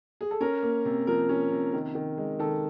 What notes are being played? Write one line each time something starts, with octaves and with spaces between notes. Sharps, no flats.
G#4
A4
C#4 A#4
A#3
C3
F3 A#4
C#4
C3
D#3
D#3
G#3
D#3 A4